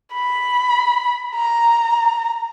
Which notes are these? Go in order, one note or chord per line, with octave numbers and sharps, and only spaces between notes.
B5
A#5